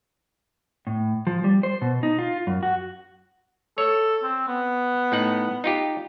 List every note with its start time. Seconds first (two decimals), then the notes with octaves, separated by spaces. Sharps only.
0.87 A2
1.27 F3
1.44 G3
1.63 C5
1.82 B2
2.03 D#4
2.19 F4
2.47 F#2
2.63 F#4
3.78 A4 C#5
4.24 C4
4.47 B3
5.12 A2 D#4 F#5
5.64 D#4 F4 G4